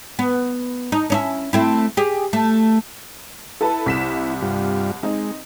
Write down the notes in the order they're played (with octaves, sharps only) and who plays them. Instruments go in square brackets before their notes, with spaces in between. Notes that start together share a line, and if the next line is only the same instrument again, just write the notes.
[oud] B3
D#4
C#4 D#4 E4
A3 C4 E4
G4 G#4
A3
[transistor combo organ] E4 [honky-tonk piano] A4 B4 A5
[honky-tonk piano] C2 B6 E7
[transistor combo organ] G2 G3 F4
[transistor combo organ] G#3 [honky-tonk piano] C4 D#4